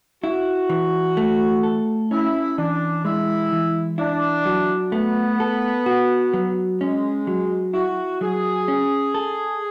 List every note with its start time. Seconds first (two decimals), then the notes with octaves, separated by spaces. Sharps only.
0.23 E4 F#4
0.69 E3
1.17 A3
1.63 A4
2.11 C#4 E4
2.58 E3 D4
3.04 G#3 E4
3.52 E3
3.98 D4 E4
4.46 F#3
4.92 A3 B3
5.40 A4
5.86 F#4
6.33 F#3
6.81 G#3 C#4
7.27 F#3
7.74 E4 F#4
8.21 F#3 G#4
8.68 C#4
9.14 A4